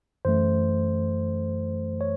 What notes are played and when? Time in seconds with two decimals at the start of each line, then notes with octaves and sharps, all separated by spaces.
0.25 F#2 E3 A3 C5
2.01 C#5